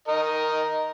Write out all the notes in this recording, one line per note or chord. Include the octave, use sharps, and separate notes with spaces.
A#4 D#5